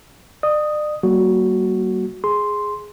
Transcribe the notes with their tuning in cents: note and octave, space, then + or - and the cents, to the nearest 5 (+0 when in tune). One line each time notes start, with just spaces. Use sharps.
D5 +40 D#6 +0
G3 -45 A#3 +0 F#4 +0
G#4 +0 C6 +0